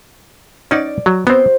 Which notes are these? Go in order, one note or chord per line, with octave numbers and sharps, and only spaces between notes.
C#4 D#4 D5 F#5
F#3
B3 C4 F#4 C5